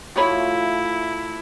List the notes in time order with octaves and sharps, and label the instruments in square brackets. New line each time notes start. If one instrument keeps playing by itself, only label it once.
[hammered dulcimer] F3 A3 [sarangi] E4 [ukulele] F#4 C#5 B5